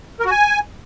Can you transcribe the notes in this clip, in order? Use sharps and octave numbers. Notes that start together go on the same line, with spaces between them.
A#4
F#4
G#5